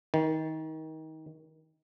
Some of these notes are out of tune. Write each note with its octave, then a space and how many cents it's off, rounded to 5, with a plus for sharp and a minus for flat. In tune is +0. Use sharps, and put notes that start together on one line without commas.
D#3 +25